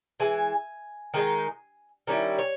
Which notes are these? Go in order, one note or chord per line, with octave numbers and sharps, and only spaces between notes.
E3 G#3 G#5
D#3 G#3 D#4
D#3 G3 C#4 E4
C#5